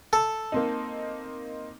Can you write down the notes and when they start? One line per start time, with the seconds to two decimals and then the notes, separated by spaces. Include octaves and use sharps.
0.13 A4
0.52 A#3 C4 D#4